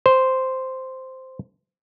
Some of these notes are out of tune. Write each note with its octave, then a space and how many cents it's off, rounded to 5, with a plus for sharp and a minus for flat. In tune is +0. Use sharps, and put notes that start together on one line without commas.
C5 -5